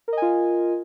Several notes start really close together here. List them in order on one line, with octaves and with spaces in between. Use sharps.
A#4 D#5 G#5 F4